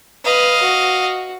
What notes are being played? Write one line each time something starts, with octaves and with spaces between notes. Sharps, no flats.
B4 D#5 F5
F#4